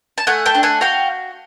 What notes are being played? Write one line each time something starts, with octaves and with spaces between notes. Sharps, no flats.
A5
A3 F#5 G#5
G5 A5
D4
F#5 G#5
F#4 F5 G5